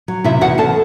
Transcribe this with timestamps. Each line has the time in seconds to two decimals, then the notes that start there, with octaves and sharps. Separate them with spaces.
0.08 F#3
0.24 C3 E4 E5
0.41 E2 F#4 F#5
0.58 E2 A4 A5